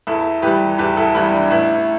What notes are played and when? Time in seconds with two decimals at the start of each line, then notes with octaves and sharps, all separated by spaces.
0.07 E2 E4 A4
0.42 E3 G3 G4 B4
0.78 E2 G4 B4
0.97 E4 A4
1.14 E3 G3 B3 E4
1.33 D4
1.50 A1 B3 E4